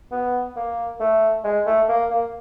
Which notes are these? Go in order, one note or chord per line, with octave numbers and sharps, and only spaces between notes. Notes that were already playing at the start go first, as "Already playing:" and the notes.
B3
A#3
A3
G#3
A3
A#3
A#3